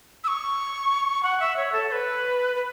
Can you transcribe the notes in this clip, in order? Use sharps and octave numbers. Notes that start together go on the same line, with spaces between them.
E6
C#6
F#5
E5
C#5
A4
C#5
B4
B4